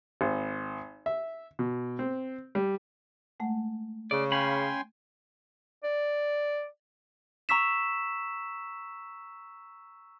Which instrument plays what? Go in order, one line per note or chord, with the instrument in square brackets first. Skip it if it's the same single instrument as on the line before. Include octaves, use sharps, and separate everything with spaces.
[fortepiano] G#1
E5
B2
C4
G3
[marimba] G#3 A3 F#5
[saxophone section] C#3 [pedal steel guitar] D5
[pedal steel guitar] C#4 F5 B5 [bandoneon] G5 G#5 C6
[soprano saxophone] D5
[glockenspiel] A#5 C#6 E6 B6 E7